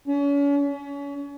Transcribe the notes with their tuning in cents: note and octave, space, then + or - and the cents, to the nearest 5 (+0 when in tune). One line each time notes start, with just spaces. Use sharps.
C#4 +40
C#4 +30